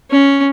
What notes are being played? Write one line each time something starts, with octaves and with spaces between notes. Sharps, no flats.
C#4